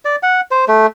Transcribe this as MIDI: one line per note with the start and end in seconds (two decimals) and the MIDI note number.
0.05 0.16 74
0.23 0.41 78
0.51 0.65 72
0.68 0.86 57